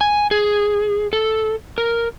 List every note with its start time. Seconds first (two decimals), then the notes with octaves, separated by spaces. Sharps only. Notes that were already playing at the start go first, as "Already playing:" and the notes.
0.01 G#5
0.31 G#4
1.13 A4
1.78 A#4